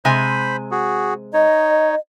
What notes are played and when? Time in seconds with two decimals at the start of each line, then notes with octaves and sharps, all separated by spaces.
0.05 C3 G#3 C5 G#5 B5
0.71 F#4 G#4
1.34 D#4 C#5 D#5